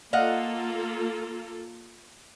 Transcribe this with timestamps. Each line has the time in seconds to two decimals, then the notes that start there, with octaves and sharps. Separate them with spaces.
0.13 A#3 F4 A4 D#5 F5 F#5